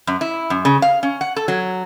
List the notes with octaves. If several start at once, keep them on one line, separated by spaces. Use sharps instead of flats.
F#2
E4
F#2
C#3
F5
C#4
F#5
A4
F#3